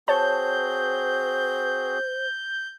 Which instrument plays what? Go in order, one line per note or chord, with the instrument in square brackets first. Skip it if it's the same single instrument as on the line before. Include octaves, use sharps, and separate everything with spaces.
[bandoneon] C4 F#4 G#4 [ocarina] C5 [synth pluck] C#5 A5 [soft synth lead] G6